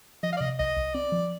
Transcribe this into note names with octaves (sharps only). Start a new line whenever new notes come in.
F3 D#5
F5
D5
C3 D#5
C2 D#5
C2
C4 D5
F3